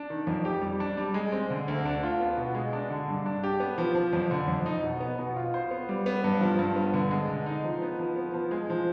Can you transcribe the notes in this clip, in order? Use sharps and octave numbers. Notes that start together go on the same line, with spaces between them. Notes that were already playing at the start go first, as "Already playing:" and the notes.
Already playing: D4
D#3
F2
G4
G3
D4
G3
G#3
C4
D3
D2
D4
F4
B3
B2
G#3
D4
D3
G2
D4
G4
B3
F3
F3
F2
D3
F2
D#4
B2
B3
B2
F4
C5
B3
G3
B3
G2
F3
G2
B3
D3
G#3
D3
D#4
F3
B3
F3
B3
F3
G#3
F3